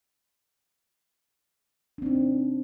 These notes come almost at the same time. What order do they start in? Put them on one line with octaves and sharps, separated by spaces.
D4 C4 D#4